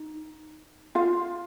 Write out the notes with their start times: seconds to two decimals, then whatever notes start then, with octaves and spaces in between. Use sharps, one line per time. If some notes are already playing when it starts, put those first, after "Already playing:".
Already playing: D#4
0.95 F4 F5